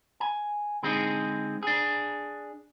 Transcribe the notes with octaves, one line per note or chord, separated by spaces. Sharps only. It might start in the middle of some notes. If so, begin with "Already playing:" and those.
G#5
D3 G#3 C4 D#4 G#4
D4 G#4